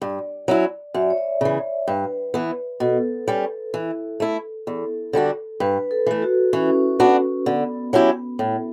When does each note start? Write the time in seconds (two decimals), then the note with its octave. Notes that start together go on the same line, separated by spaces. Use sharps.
0.02 G2 D5
0.48 F#3 C#4 E4
0.94 F#2 E5
1.02 D5
1.10 C#5
1.18 D5
1.41 C#3 E3
1.88 G2 B4
2.34 E3 B3
2.80 B2 A4
3.28 G3 C#4
3.74 E3
4.20 A3 E4
4.67 E2 A4
5.13 D3 G3 D4 F#4
5.60 G2 B4
5.91 A4
6.06 E3 A3
6.22 F#4
6.53 E3 C#4
7.00 B3 D4 F#4
7.46 D3 B3
7.93 F#3 C#4 E4 G4
8.39 A2